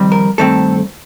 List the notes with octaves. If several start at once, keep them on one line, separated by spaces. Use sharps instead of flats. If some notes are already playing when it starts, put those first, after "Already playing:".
Already playing: F2 D#3 G3 C4
A#4
G2 D#3 A3 C4 A4